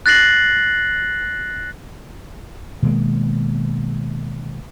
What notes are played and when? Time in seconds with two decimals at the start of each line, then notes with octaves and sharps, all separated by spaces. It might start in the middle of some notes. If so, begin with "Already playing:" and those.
0.06 F#6 A6 A#6 C7 F#7
2.83 B2 D#3 G#3 A#3